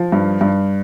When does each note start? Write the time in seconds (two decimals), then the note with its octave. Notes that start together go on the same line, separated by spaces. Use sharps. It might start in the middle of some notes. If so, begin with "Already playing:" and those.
Already playing: F3
0.12 G2
0.41 G2